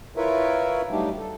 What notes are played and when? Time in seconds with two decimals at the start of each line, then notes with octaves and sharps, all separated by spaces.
0.17 E4 F4 A#4 B4 C#5 E5
0.91 F#3 G3 A3 D4 D#4 G4
1.18 A4